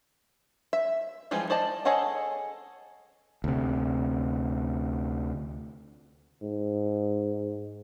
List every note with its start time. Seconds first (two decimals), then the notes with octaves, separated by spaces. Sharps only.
0.73 E5
1.31 E3 F3 G3 G#3
1.50 C5 D5 D#5 A5
1.85 G#4 A4 C#5 D#5 F#5
3.44 D2 C3
6.42 G#2